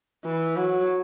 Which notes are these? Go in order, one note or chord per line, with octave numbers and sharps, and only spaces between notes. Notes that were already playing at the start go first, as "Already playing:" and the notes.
E3
F#3